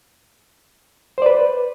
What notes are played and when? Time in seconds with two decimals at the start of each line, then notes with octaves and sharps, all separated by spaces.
1.18 C5
1.22 D5
1.26 B4